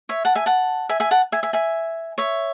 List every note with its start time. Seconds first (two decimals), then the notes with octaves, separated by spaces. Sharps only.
0.09 C#5 E5
0.25 F#5 A5
0.35 E5 G#5
0.46 F#5 A5
0.89 E5 G#5
1.00 E5 G#5
1.11 F#5 A5
1.32 E5 G#5
1.43 E5 G#5
1.53 E5 G#5
2.18 C#5 E5